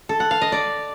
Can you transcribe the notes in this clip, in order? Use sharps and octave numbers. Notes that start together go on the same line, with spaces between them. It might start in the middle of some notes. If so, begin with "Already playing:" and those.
A4
F#5
F5
D#5
D5